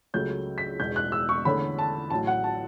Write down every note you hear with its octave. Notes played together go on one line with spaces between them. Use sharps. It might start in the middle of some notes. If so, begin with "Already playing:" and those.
C#2 C#3 F#3 A3 C#4 G6
B6
E1 E2 B2 G6
F#6
E6
C#6
E2 D3 A3 C#4 B5
A5
A1 A2 F#3 A5
F#5
A5